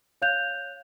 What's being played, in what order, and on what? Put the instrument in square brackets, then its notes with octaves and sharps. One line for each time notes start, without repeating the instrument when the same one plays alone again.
[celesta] C#5 F5 F#6 G6 F7